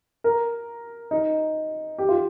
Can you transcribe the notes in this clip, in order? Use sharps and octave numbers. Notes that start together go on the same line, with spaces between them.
A#4
D#4
G4
F4